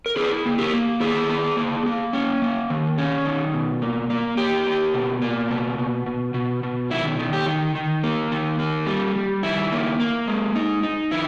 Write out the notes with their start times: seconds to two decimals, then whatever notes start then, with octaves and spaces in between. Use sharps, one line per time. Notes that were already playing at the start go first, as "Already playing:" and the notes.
0.06 A#4
0.16 E4 G#4 B4
0.45 A#3
0.58 G4 A#4
0.74 A#3
1.00 D#3 E4 G#4
1.29 E4
1.57 A#3
1.86 A#3
2.13 C#4
2.42 A#3
2.70 D#3
2.98 C#4
3.25 D#3
3.54 B2
3.82 A#3
4.10 A#3
4.37 A#3 G4
4.67 A#3
4.94 B2
5.22 A#3
5.51 B2
5.78 B2
6.06 B2
6.34 B2
6.63 B2
6.90 D#3 E4
7.19 D#3
7.33 G4
7.46 D#3
7.75 D#3
8.03 A#3
8.32 D#3
8.59 A#3
8.87 G3
9.16 G3
9.43 D#3 E4
9.72 A#3
10.00 A#3
10.27 G#3
10.55 D#4
10.83 D#4
11.11 D#3 E4